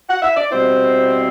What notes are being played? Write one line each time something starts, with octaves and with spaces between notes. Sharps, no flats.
F#5
E5
D5
B2 G3 C4 E4 C5